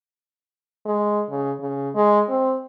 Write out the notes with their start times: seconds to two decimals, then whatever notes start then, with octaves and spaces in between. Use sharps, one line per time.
0.85 G#3
1.30 C#3
1.59 C#3
1.95 G#3
2.29 C4